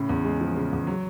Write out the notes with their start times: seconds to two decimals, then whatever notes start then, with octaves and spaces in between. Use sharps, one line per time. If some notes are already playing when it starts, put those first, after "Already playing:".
Already playing: A2 C#3
0.09 E2
0.25 G#3
0.41 F3
0.56 C#3
0.73 E2
0.87 F#3